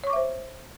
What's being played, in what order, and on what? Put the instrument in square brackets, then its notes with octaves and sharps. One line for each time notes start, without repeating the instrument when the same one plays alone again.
[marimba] C#5
C#6
D6
E5
C5